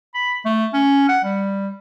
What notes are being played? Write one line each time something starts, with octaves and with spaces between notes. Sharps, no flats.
B5
A3
C#4
F#5
G3